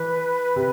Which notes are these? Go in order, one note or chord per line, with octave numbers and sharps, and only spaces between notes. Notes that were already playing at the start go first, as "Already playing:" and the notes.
Already playing: E3 B4
C3